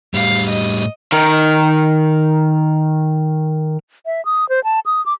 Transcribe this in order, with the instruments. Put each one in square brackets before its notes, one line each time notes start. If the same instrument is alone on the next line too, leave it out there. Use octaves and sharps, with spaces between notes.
[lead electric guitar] A2 G3 [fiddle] F5
[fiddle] D#5
[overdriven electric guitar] D#3 A#4
[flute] E5
D#6
C5
A5
D#6
D6